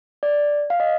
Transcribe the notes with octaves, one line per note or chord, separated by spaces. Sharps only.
D5
F5
D#5